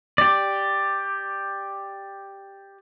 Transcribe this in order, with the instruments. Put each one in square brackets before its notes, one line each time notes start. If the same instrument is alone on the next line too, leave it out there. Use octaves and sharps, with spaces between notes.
[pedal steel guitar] G4 D5